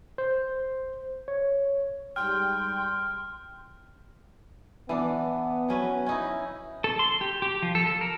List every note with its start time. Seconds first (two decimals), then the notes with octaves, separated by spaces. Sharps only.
0.18 C5
1.28 C#5
2.16 G#2 G3 G5 C6 F6
4.89 E3 B3 D4
5.69 F#3 C#4 B4
6.06 C#4 D#4 E4
6.84 A4
6.99 C6
7.21 G4
7.42 G4
7.62 F3
7.75 A4
7.86 A4
8.01 A#4